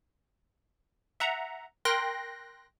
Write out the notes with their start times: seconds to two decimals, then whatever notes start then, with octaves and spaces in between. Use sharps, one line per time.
1.20 E5 F#5 A#5
1.85 A#4 G5 C6 F#6 A#6